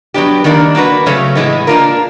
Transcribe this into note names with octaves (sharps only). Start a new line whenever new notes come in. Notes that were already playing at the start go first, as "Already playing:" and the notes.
F#3 B3 D4 G4
D#3 G3 A#3 D4
A#3 D4 F#4 B4
C#3 F#3 A3 C#4
A2 E3 G#3 B3
A#3 D4 F4 A#4